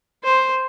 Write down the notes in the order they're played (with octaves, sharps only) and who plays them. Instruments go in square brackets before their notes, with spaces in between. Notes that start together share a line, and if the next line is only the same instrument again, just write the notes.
[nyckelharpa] C5